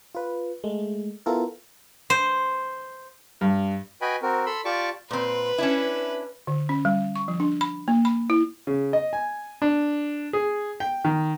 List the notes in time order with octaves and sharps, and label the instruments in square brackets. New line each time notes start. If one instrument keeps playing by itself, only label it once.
[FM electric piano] F4 B4
G#3 A3
B3 E4 F4 A4 A#4
[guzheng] C5
[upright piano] G2
[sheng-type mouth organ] F#4 B4 D#5 G5 G#5 B5
C4 F#4 A#4
A4 B5 C6 E6
F4 G4 D5 A5 C#6 D6
[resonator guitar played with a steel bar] A#2 C4 [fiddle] B4
[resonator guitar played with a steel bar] C#4 D4 E4
[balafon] D3
C#4
G3
C#6
F3
D4
B5
A#3
B5
E4
[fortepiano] C#3
D#5
G#5
D4
G#4
G5
D#3